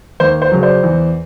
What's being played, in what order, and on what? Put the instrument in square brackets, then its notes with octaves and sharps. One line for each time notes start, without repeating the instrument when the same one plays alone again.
[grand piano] D#2 C5
C5
C#3 F#3
C5 D5
E2